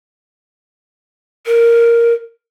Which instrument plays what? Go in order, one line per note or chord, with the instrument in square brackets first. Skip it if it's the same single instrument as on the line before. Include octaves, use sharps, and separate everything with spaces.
[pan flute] A#4